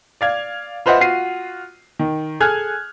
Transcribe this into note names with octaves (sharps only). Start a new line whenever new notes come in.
D5 F5 G#6
F4 B4 C5 D#5 E5 F#5
F4 F#4 C7 D#7
D#3
G#4 A4 G#5 F6 F#6 G#6